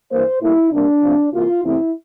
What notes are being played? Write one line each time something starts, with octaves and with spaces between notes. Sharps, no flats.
G2 E3 A#3 C5
A2 G3 A#3 E4
C3 G3 A#3 D4
C3 F3 A3 C4
C3 E3 A#3 F4
E2 C3 E3 A3 C4 E4